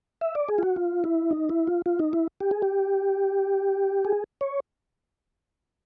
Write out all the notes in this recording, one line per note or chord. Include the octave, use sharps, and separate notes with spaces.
E5
D5
G#4
F4
F#4
F4
E4
D#4
E4
F4
F4
D#4
E4
G4
G#4
G4
G#4
C#5